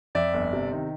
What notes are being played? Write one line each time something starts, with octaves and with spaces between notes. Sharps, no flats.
F2 D5 E5
G1
C3
D#3